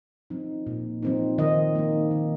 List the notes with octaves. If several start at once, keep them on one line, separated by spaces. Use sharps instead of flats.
F3 C4 D#4
A#2
F3 C4 D#4
D#3 D#5
A#3 D#4
D#3